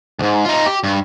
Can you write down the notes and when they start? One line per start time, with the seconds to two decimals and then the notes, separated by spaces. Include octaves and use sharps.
0.19 C#2 G#2
0.45 D#4 F4
0.66 G4
0.84 G2